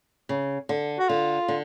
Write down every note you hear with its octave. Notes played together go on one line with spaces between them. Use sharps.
C#3
D3
F#4
D3 F4
D3